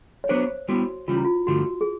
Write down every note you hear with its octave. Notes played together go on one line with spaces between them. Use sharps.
C#5
F#3 B3 D4 F#4 B4 C5
G3 B3 E4 F#4
C#3 E3 G3 F4
E4
F4
G2 D3 F3 A3 F#4
G#4